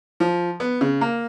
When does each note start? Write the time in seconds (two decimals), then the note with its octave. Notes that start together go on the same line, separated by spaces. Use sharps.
0.20 F3
0.60 B3
0.81 C#3
1.01 A#3